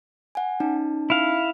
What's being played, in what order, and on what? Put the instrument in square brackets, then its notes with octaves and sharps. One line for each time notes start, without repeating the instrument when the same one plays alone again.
[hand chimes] F#5 G#5
C#4 D#4 A5
[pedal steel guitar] E4 F5